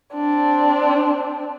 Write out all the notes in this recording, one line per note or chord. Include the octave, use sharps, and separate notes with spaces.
C4 D4